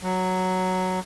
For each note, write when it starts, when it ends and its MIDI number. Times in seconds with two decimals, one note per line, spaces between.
0.03 1.00 54